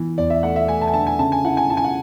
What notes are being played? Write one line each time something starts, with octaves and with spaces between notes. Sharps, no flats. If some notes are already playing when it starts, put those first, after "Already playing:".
Already playing: E3 B3
E2 D5
E5
A3 F#5
E5
A3 G#5
A5
G#5
D3 A5
G#5
C#3 A5
G#5
E4 F#5
G#5
E4 A5
G#5
F#5